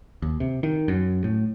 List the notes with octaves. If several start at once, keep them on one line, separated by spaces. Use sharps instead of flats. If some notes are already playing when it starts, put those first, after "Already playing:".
D#2
C3
D#3
F#2
A2